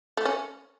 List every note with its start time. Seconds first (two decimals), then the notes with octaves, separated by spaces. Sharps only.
0.17 A3
0.25 C#4